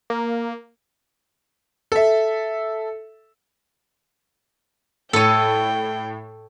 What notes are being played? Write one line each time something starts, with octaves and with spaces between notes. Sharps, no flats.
A#3
A4 E5
A2 A4 C#5 G5 D#7